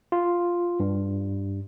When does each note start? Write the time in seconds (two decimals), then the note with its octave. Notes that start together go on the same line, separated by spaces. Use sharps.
0.12 F4
0.80 G2